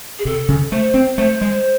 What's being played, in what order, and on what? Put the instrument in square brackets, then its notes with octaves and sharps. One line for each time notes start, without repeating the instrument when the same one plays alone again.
[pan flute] G#4
[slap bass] C3 [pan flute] A4
[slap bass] C#3
[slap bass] A3 [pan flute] C5
[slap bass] C4
[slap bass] A3 [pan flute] C5
[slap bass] G#3